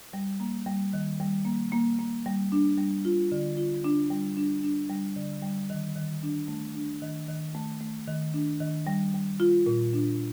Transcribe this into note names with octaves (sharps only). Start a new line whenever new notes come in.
G3
A#3
G3
D#3
G3
A#3
A#3
A#3
G3
D4
G3
F4
D3
F4
D4
G3
D4
D4
G3
D3
G3
D#3
D#3
D4
A3
D4
D#3
D#3
A3
A3
D#3
D4
D#3
G3
G3
F4
A#2
D4